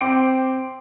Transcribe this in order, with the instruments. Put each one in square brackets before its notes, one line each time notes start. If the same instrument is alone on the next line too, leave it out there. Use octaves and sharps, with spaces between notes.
[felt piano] C4 G5 C6 D6 C7 D7